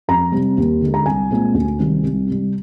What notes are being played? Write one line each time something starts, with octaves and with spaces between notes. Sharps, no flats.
F2 A#5
C3 G3 C4
D#2
D3 G#3
A#5
C2 G#5
A#2 G#3 C4
D2
C3 D#3 G3 C4
C2
C3 G3